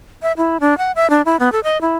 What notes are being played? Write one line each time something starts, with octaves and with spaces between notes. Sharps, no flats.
E5
E4
D4
F#5
E5
D4
E4
B3
A4
D#5
E4